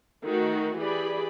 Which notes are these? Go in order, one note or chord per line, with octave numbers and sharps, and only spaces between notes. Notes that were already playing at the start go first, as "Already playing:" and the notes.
D#3 A3 F#4
E3 G4 G#4 D5 B5